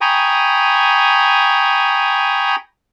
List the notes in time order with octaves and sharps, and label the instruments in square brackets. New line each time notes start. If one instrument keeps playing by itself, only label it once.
[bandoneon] G5 G#5 A#5 B5 C#6 D#6